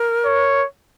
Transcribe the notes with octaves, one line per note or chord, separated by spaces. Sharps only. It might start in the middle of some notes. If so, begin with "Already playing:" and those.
Already playing: A#4
C#5